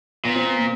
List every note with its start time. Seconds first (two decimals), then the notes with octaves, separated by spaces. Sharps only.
0.24 A#2 B3
0.36 C4
0.46 B3
0.58 A#3